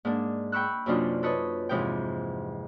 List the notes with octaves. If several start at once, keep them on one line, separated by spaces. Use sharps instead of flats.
G#2 A#3 D4
G5 B5 C#6 E6 F#6
F#2 C3 A#3 D4 D#4 F4
A4 B4 C#5 D#5
F2 G#2 C3 E3 D#4 G5